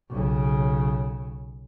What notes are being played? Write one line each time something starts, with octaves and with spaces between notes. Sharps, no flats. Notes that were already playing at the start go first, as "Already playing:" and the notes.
B1 C#3